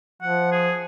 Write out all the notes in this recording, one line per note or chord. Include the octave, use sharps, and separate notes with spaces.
F3 F#5
G#4